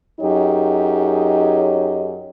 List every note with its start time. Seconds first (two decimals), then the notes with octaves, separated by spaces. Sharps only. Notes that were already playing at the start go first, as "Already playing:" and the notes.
0.21 F#2 D#4 G4 G#4 C#5 D#5